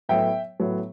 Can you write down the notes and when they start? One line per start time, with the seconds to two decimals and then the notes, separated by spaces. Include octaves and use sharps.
0.09 A2 F#3 B3 E5 G5
0.60 A2 F#3 B3